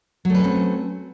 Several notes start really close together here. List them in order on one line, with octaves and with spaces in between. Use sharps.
F#3 A3 B4 C#4 C4